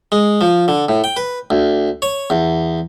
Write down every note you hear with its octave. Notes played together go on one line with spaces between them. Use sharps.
G#3
F3
D3
A2
G5
B4
D2
C#5
E2